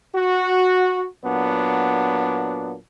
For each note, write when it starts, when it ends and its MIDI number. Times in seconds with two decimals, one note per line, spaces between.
0.16 1.05 66
1.25 2.76 46
1.25 2.76 54
1.25 2.76 59
1.25 2.76 62